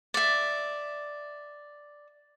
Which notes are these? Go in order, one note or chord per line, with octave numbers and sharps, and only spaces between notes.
D5 E5